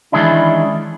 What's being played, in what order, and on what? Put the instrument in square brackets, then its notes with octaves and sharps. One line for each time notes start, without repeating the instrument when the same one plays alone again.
[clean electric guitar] D#3 E3 G#3 C#4 D4 E4